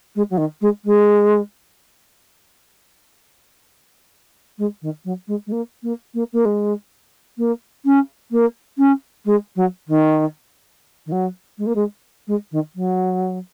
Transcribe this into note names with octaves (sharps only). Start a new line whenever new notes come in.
G#3
F#3
D#3
G#3
G#3
G#3
D#3
F#3
G#3
G#3
A#3
A#3
A#3
A#3
G#3
A#3
C#4
A#3
C#4
G#3
F#3
D#3
D#3
F#3
G#3
A#3
G#3
G#3
D#3
F#3